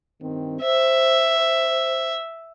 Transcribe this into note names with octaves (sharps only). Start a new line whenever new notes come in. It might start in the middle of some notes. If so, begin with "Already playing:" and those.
G2 D#3 C4
C5 E5